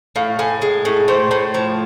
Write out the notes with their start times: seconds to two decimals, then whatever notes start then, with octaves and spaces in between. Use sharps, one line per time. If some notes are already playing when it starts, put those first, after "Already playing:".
0.16 A2 F5
0.39 A2 G#5
0.62 G#3
0.85 A2
1.08 A2 C5
1.31 A2 C5
1.54 F3